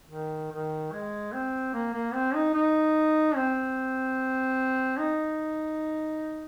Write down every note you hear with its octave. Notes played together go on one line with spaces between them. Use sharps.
D#3
D#3
G#3
C4
A#3
A#3
C4
D#4
D#4
C4
D#4